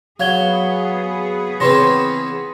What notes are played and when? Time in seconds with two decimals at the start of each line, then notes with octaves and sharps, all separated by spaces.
0.20 F#3 B3 G#4 F5 G#6 G7
1.60 C#3 E3 C4 C6 A#6